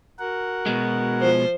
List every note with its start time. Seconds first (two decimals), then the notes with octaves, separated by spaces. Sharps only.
0.19 F#4 A#4 F#5
0.66 B2 G#3
1.21 F3 C5